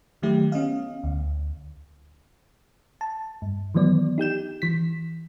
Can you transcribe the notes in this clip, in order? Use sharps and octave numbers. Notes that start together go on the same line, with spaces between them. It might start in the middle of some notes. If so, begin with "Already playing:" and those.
D#3 F#3 A3 E4 G4
B3 C#4 D#5 F5
D2
A5
G2
D#3 E3 F#3 B3 D5
D#4 G4 G6 E7
E3 B6